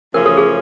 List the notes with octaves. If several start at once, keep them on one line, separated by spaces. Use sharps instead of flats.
F#2 C#3 F3 A3 C#4 A#4
A4
G#4